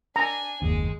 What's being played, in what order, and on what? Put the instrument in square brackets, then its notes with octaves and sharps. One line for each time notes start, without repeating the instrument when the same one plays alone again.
[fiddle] D4 G#5 [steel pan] A#5
[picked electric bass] F#1 D#2 [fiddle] G#3